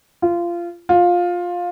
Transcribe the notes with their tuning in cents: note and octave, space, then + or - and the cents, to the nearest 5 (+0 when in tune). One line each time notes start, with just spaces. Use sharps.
F4 -20
F4 +15